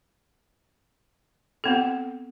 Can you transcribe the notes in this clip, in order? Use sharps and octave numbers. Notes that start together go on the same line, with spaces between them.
B3 C4 A4